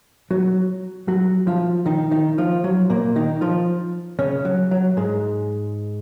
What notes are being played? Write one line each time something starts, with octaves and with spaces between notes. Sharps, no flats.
F#3 F#4
F#3 F#4
F3 F4
D#3 D#4
D#3 D#4
F3 F4
F#3
A#2 A#3
D#3 D#4
F3 F4
C#3 C#4
F#3
F#3
G#2 G#3